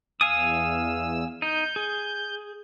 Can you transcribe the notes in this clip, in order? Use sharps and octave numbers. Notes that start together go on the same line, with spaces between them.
E2 F5 G#5 D#6 E6
D#4 G6
G#4